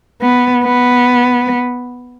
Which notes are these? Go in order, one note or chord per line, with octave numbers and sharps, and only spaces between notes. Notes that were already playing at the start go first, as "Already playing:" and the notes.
B3
B3